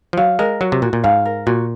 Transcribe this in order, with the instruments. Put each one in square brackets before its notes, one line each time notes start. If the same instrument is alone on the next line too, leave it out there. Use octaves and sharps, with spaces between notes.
[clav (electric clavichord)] F3
[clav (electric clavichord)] F#3 [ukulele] F5
[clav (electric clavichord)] G#3 [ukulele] A#4
[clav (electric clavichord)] F#3 [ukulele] F#4
[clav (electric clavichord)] C3
[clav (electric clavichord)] A#2 [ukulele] F#4
[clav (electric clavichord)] A#2
[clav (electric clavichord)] G#2 [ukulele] F5
[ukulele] A#4
[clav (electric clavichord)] A#2 [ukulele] F#4